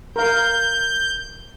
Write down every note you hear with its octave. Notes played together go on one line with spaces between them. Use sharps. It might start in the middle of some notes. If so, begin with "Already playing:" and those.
A#4 F5 G6